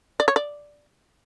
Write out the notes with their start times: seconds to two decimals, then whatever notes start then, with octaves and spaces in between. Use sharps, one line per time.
0.20 D5
0.28 C#5
0.36 D5